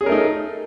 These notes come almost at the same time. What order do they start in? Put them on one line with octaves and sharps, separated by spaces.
G#4 C#4 A#4 A3 D#4